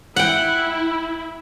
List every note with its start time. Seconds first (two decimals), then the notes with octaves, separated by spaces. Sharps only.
0.16 E4 F#5 G5